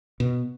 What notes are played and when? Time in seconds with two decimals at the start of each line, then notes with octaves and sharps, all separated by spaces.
0.20 B2